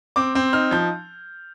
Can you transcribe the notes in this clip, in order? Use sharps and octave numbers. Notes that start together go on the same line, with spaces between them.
C4 D6
C4
D#4 F6
F3 G6